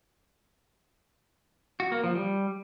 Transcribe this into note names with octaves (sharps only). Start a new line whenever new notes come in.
F#4
A#3
F3
G3